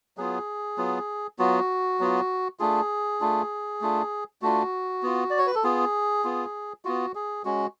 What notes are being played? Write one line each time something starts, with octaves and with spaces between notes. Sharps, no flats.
F#3 B3 F4 G#4
F#3 B3 F4
F#3 B3 F4 F#4
F#3 B3 F4
A3 D4 F4 G#4
A3 D4 F4
A3 D4 F4
A3 D4 F4 F#4
B3 F4
D5
C#5
B4
A4
B3 F4 G#4
B3 F4
B3 F4 F#4
G#4
G#3 C#4 F#4